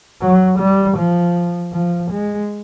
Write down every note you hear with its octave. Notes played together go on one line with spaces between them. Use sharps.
F#3
G3
F3
F3
G#3